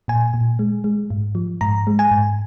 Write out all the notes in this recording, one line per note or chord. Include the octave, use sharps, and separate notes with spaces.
A#2 G#5
A#2
G#3
G#3
G#2
F3
G#2 A#5
G#3
G#5
G#2